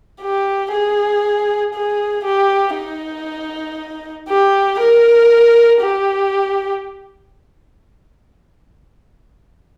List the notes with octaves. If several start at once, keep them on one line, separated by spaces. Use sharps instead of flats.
G4
G#4
G#4
G4
D#4
G4
A#4
G4